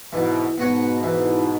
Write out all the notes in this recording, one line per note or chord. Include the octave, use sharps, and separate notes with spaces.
G#2 B2 E3
G#2 B2 B3 F#4 C#5
E3